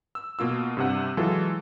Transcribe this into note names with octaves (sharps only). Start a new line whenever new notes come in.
E6
B2 A#3 F4 E6
G2 C3 F#5
E3 F#3 G#3 F4 A4